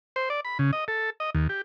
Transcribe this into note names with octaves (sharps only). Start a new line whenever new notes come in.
C5
D5
B5
C#3
D#5
A4
D#5
D#2
G4